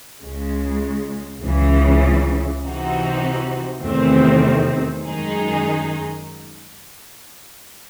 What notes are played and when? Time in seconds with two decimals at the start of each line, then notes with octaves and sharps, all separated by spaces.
0.21 C#2 C#3 G#3
1.42 C#2 C#3 E3
2.62 C3 E3 C4 D#4 F#4
3.82 E2 C3 D#3 A3 C4
5.02 F#2 D#3 G#3 D#4 G#4